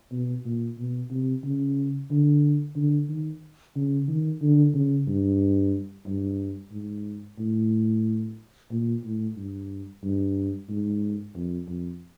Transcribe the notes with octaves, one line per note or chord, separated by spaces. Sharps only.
B2
A#2
B2
C3
C#3
D3
D3
D#3
C#3
D#3
D3
C#3
G2
G2
G#2
A2
A#2
A2
G2
G2
G#2
F2
F2